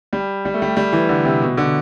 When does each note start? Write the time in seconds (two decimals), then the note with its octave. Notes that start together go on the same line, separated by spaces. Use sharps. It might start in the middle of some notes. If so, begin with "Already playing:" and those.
0.13 G3
0.45 G3
0.54 A3
0.62 G3
0.77 G3
0.93 E3
1.09 D3
1.25 C3
1.42 B2
1.57 D3